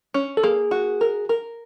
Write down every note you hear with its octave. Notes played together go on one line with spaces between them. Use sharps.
C#4
A4
A#3 G#4
F#4
A#4
A#4